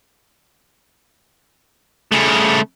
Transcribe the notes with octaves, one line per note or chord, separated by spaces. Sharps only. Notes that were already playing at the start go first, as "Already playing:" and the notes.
C#3 A3